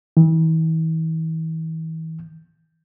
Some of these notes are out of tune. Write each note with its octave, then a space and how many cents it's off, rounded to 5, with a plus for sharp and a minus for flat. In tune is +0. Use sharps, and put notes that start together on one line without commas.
E3 -40